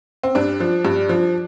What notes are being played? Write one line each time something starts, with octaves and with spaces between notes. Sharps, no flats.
C4
G2 D4
F3
G2
F3